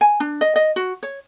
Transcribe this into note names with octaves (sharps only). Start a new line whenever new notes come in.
G#5
D4
D#5
D#5
F#4
C#5